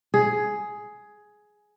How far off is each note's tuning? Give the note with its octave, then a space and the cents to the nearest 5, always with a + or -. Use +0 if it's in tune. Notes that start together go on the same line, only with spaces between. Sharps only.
G#4 +10